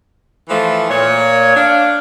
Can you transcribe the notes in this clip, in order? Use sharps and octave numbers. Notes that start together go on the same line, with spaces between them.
E3 F3 A3
A#2 C#5
D4 F5